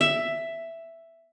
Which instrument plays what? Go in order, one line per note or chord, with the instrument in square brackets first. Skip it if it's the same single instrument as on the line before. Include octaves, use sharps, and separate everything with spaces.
[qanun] E5